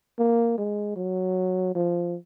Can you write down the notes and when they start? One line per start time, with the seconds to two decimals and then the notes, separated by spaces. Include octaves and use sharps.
0.19 A#3
0.58 G#3
0.96 F#3
1.75 F3